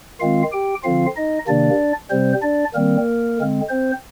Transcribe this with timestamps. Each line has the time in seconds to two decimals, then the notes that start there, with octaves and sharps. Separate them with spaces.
0.20 D#3 G#3 C4 F4 F5
0.53 G4 G5
0.84 D3 F3 C4 F4 F5
1.16 D#4 D#5
1.47 C3 D#3 A#3 D4 D5
2.11 C3 G3 C4 C5
2.42 D4 D5
2.74 D#3 G3 A#3 C4 A#4
3.38 D3 G#3 C4
3.69 C4 C5